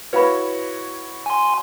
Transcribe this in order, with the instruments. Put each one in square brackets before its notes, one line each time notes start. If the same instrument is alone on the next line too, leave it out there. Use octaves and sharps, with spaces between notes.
[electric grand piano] E4 F#4 C#5 [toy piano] B4 F5 B5
[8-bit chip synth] G#5 C6